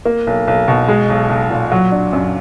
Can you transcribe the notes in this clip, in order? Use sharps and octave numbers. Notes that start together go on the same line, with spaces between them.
A#3
B1
B1
B2
G#3
B1
B1
A#2
F#3
D4
F#2